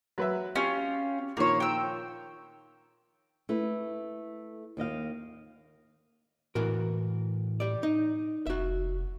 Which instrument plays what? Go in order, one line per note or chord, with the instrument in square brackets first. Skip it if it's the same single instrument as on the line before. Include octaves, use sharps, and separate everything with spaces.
[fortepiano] F#3 B4 E5
[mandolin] C#4 F4 [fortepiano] G4
[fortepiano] A#2 D#3 F3 [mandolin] A#3 C#5
[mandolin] G5 E6
[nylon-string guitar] A3 E4 B4
D#2 D#3 D#5 F5
[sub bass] A2 [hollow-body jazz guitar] E3 F#4 A#4
[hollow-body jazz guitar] G4 D5
D#4
[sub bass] F1 [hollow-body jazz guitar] F#4 E5